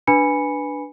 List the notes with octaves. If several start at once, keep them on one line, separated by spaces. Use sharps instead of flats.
D4 B4 G#5 B5 C#7